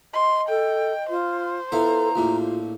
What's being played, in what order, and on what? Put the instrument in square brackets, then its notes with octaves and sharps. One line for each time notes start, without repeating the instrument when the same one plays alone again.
[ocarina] D#5 [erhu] C6
[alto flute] A4 [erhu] G5
[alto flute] F4 [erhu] C5
[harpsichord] B3 E4 F4 [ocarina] A4 [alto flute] A#5
[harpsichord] A#1 A2 A#3 [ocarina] F4